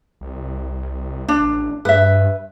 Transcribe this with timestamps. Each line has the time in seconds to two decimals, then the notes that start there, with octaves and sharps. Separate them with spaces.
0.21 C2
1.28 D4
1.41 A1
1.85 G2 B4 E5